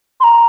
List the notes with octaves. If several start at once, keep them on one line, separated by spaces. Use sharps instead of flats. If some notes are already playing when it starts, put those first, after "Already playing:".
C6
A#5